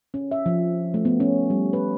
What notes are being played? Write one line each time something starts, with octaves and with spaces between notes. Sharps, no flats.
C#4
E5
F3
A3
B3
C#4
G3
B4